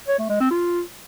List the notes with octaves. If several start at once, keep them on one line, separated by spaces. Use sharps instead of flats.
C#5
A3
G#3
C4
F4